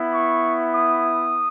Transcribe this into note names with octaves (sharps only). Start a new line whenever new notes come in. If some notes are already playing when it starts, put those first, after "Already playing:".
Already playing: B3 E4
C#6
D#6